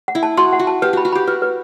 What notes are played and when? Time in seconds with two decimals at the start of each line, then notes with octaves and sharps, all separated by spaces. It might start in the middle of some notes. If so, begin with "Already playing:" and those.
0.08 F#5
0.15 E4
0.23 A5
0.37 F#4 C6
0.53 F#5
0.59 F#4
0.67 A5
0.82 G4 B4
0.93 F#4 B5
1.05 F#4
1.12 G4 B5
1.27 F#4 B4
1.42 B4